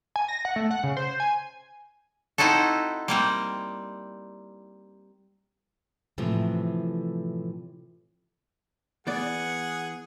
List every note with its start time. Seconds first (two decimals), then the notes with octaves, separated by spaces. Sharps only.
0.16 G#5
0.28 A#6
0.45 F#5
0.56 A3
0.71 F#5
0.83 C#3
0.97 C5
1.20 G#5
2.38 C4 D#4 E4 F#4 A4
3.08 G3 A#3 C4
6.18 A2 C3 E3 F3 A3
9.07 E3 B3 G#4 D5 F#5